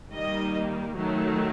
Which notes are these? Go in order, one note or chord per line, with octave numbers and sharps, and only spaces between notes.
D#3 G3 A#3 D#5
D#3 F#3 A3